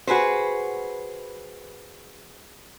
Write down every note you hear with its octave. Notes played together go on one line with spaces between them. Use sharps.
F#4 G#4 B4 C5